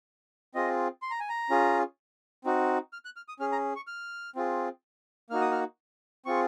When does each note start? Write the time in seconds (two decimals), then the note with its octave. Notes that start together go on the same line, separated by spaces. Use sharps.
0.55 C4 F4 G#4 D#5
1.02 C6
1.11 A#5
1.20 G#5
1.29 A#5
1.50 C#4 F4 G#4
2.45 C4 D#4 F#4
2.93 F6
3.05 F#6
3.16 F6
3.28 D#6
3.40 C#4 G#4 F6
3.52 A#5
3.76 C#6
3.87 F6
4.36 C4 F4 G#4
5.30 A#3 D#4 F#4 F6
5.41 D#6
5.52 F6
6.26 C4 F4 G#4 C#6